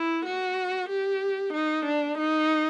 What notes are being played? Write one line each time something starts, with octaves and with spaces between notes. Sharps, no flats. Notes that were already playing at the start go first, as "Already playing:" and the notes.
Already playing: E4
F#4
G4
D#4
D4
D#4